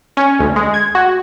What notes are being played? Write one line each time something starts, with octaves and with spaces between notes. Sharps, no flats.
C#4
D2
G#3
G#6
F#4